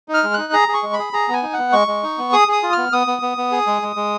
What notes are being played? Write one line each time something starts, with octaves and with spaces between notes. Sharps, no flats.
D#4
F6
G#3
D#4 F#6
G#4 A#5
G#4
C#6
G#3
B5
G#4
G#4 A#5
B3 G#5
D#4
B3 F#5
G#3 C#6
G#3
D#4
B3
G#4 D#6
G#4 D#6
F4
B3 F6
B3 D#6
B3
B3
B3
G#4
G#3
G#3
G#3